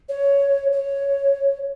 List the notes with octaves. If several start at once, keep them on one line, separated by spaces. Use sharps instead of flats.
C#5
C#5